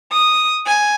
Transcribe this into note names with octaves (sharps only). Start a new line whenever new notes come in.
D#6
G#5